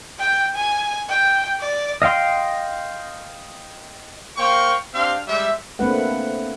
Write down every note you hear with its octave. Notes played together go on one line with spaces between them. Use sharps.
G5
G#5
G5
D5
D#5 F5 G5 C6
A#3 C5 F5 G5 C#6
C4 D4 G4 F5 C6
G3 G#3 E5
A3 A#3 C4 D4 B4 F#5